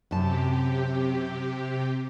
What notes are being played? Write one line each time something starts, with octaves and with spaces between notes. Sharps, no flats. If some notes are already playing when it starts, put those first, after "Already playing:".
F#2 C3 G4 A5